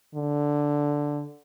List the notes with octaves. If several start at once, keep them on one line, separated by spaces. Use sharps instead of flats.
D3